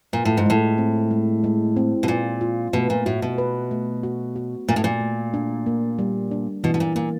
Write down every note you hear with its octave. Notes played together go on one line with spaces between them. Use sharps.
A#2 F4
A2
G#2
A2 G#3
C4
G#3
G#3
C4
B2
A#2 F4
F4
B2 A3
A#2
A2 F#4
B2
B4
A3
F#4
F#4
A#2 A3
A2
A#2
A3
D4
A#3
G3
D4
B2 E3
B2
A#2
A#2 A#3